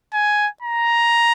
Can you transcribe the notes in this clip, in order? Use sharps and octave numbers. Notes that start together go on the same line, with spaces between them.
G#5
A#5